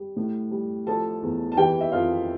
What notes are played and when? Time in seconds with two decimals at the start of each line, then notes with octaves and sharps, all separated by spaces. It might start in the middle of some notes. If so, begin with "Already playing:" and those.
Already playing: G3
0.16 A2
0.51 G3
0.87 F3 A4 A5
1.22 E2
1.52 A5
1.57 E3 G4 G5
1.81 E5
1.92 F2 F4 F5